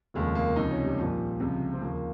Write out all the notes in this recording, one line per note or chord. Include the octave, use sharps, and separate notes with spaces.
F1 D#2 C#3 F3 G#3
A#3
C#2 C3 F3 D#4
C#4
G3
A#1 A#2 F3
C#2 C3 F3
C4
D#2 C#3 F3 A#3